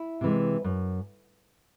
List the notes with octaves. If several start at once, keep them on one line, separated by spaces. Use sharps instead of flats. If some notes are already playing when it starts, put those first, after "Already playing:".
Already playing: E4
C3 E3 G#3
F#2